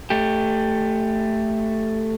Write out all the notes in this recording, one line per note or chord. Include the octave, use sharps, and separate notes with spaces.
A3 G4